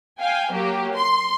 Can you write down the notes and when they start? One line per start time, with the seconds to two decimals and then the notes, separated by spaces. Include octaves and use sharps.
0.20 F5 G5 G#5
0.52 F#3 A#3 G4
0.93 C6